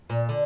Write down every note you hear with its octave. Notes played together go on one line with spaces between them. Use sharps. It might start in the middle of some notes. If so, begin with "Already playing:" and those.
A#2
D3